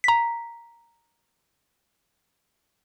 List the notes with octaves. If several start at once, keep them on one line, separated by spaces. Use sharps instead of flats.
A#5 B6